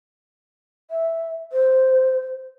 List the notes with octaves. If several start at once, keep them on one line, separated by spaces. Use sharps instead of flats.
E5
C5